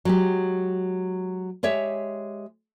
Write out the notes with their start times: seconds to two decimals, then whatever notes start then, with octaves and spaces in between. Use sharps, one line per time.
0.05 F#3 G#3 G4
1.63 G#3 G4 C#5 E5